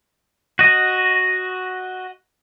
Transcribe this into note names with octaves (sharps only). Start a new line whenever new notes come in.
F#4 D#5